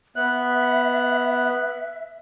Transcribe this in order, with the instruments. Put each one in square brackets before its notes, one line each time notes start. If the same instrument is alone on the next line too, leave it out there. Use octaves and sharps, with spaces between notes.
[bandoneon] B3 F#6 [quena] E5